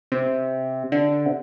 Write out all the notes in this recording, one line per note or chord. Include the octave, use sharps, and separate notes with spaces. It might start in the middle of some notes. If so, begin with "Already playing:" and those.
C3
D3
C3